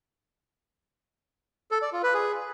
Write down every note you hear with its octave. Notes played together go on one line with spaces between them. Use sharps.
A4
D5
F4
B4
G#4